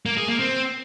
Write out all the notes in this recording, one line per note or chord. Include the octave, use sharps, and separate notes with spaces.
A#3
G#4
A#3
C4